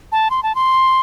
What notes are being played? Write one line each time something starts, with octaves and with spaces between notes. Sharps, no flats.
A5
C6
A5
C6